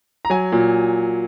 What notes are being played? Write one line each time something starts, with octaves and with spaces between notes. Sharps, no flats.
A#5
F#3 G#5
A#2